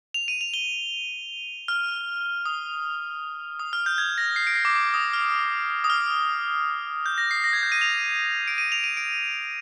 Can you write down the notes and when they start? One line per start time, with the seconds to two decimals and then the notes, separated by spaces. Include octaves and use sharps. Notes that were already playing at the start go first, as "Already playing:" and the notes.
0.14 F7
0.28 D#7
0.41 F7
0.54 G7
1.68 F6
2.46 D#6
3.59 D#6
3.73 F6
3.86 G6
3.98 G#6
4.18 A#6
4.36 C7
4.47 D7
4.56 C7
4.65 D6
4.75 D6
4.94 D#6
5.13 F6
5.84 D#6
5.90 F6
7.06 G6
7.18 A#6
7.31 C7
7.44 A#6
7.53 G#6
7.63 G6
7.72 D#7
7.81 F7
8.48 D7
8.58 D#7
8.72 F7
8.84 D#7
8.97 D7